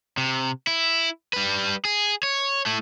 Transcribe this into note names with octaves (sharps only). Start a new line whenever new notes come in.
C3
E4
G3 B4
G#4
C#5
A3 E4